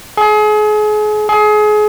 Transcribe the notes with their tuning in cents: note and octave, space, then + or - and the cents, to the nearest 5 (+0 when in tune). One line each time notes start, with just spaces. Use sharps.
G#4 +35
G#4 +30